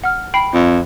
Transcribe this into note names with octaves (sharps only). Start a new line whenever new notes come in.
F#5 F6
G5 B5 C7
F2